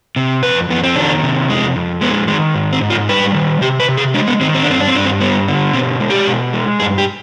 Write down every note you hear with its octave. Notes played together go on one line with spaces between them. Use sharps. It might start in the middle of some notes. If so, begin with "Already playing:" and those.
C3
F2 B4
F2 B3
C4
D#3 D4
C3
F2 G#3
F2
G#3 B3
D#3 G#3
G#2
C4
G#2
F4
G3 B4
D#3
C3 G4
B4
C3
G#4
G#3 D4
B3
D#3 C4
C4
D4
G2 C4
D4
C4
G2 D4
C4
G3 B3
D3
B2 C4
G#3
G4
B2
G#3
G2 G#4
G4